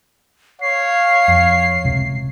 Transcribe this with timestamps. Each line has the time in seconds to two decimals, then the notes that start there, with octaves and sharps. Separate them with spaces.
0.62 C#5 F5 C7
1.28 F2
1.84 D#1 C#2 C3